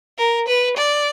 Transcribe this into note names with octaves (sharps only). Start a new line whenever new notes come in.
A#4
B4
D5